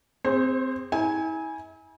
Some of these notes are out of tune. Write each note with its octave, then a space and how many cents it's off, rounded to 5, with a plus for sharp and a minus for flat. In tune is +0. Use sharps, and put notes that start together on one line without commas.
C4 -15 G#4 -30 C5 +40
E4 -40 G#5 +0